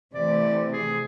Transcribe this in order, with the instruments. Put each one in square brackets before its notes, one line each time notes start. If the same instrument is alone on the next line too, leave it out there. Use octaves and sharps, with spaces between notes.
[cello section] C3 E3 A3 [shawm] D5
[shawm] G#4